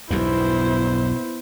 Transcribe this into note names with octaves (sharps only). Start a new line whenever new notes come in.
B1 E2 G2 B2 E4 C5